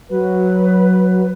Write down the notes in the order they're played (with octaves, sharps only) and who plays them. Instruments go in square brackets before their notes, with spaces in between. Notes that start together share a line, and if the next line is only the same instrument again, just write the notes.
[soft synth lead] F#3 [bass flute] B4